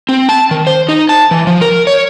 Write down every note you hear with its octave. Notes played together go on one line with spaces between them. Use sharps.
C4
A5
D#3
C5
D#4
A5
E3
F3
A#4
C#5